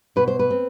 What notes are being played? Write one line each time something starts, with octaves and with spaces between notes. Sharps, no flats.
B2 B4
C5
B4
C4